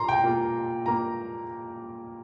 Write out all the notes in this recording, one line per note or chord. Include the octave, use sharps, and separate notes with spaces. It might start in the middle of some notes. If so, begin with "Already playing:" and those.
Already playing: A#2 A#3 A#5 C6
G5
A#2 A#3
A#2 A#3 A#5